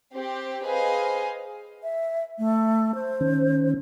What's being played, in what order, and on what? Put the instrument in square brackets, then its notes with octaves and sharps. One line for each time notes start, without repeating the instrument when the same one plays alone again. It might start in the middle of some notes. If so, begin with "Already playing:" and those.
[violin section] C4 G4
G#4 B4 C5 D#5 F5 G#5
[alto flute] E5
A3
C5
[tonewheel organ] D#3 C#4